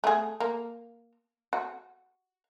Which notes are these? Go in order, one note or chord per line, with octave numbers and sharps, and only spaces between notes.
A3 G#4
A#3
F#4